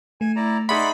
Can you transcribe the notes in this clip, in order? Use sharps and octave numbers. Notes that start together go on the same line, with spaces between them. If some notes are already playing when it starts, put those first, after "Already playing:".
A3 G#5
E4 D5 A#5
D#4 G#4 D5 E5 F#5 B5 C6